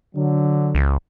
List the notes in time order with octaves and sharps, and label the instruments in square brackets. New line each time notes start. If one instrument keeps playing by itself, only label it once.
[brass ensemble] D3 F#3
[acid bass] C#2